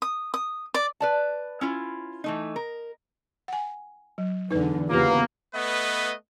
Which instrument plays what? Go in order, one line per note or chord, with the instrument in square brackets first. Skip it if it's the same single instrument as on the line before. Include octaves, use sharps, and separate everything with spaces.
[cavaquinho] D#6
D#6
D5
[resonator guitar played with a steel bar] B4 D5 A5
C#4 E4 F4
E3 A3 D#4
A#4
[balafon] F#5 G#5
F#3
[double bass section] E2 D3 [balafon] D#4 B4
[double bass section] E2 C#3 B3 [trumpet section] A#3 [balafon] F4 G4
[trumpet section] A3 B3 B4 D#5